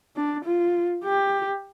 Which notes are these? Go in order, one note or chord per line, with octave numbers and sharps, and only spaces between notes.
D4
F4
G4